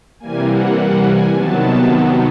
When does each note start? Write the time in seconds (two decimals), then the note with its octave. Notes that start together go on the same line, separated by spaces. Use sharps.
0.20 C3 E3 G3 A#3 G#5
0.48 F#5
0.76 F#5
1.05 G#5
1.33 C3 D#3 F#3 B3 A5
1.61 A5